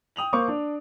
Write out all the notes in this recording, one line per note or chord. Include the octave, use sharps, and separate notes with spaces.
G5 D#6 F7 F#7
A#3 C5 C#6 D6
D4